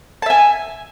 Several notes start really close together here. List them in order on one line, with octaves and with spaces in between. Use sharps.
A5 E5 G#5